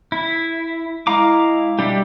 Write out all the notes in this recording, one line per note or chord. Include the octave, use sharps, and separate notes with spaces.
E4
G#3 E4 F5 A#5 D6
B2 G3 D4 G4 E5